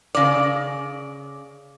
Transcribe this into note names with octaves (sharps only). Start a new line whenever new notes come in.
C#3 D5